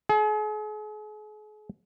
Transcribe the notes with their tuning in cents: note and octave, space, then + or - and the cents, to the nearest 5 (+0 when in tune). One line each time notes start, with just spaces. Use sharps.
G#4 +40